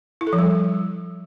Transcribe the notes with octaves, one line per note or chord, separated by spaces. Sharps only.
E4
A4
F3
G3